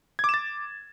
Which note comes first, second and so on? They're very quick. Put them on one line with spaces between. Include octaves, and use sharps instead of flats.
G#6 D6 E7 A6